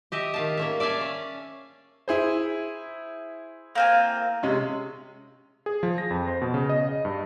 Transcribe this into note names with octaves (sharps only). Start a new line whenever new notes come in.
G4 D#5 E5
D#3 F5 A5
A#3 C#4 E5
D5 E5 F5 G#5 A5
C#4
E4 G#4 C5
A#3 C4 G#5
C3 G#3 C#4
G#4
F3
A#6
F2
C5
B2
C#3
D#5
D#5
G2